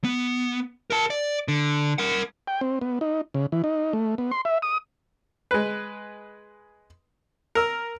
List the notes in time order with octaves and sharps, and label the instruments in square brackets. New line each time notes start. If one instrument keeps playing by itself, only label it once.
[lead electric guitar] B3
A#4 A5
D5
D3
A#4 F#5
[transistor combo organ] G5
C4
B3
D#4
C#3
E3
D#4
A3
B3
C6
E5
D#6
[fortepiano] G#3 B4
A#4 E6